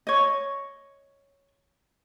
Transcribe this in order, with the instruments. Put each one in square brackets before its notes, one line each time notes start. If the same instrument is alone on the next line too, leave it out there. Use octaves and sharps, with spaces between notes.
[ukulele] C#5 D#5